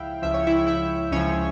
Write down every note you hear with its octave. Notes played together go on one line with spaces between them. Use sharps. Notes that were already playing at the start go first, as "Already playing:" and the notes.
Already playing: C#2 C#3 F3 E4 E5 F5 G5
C#2 C#3 F3 E5
C#5
E4 E5
E4 E5
C#2 C#3 F3 C#4 C#5